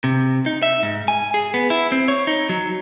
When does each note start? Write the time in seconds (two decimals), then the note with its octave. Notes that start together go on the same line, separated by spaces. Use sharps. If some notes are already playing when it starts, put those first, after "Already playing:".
0.04 C3
0.46 D#4
0.63 E5
0.83 G#2
1.08 G#5
1.34 G#4
1.54 B3
1.70 E4
1.92 C4
2.08 C#5
2.27 D#4
2.49 F#3